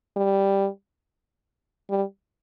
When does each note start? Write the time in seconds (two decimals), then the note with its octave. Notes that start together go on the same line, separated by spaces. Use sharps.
0.16 G3
1.90 G3